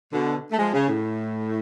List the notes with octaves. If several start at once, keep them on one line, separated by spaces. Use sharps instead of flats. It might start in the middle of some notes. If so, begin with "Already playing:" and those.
B2 D3
A3
F3 G#3
C#3
A2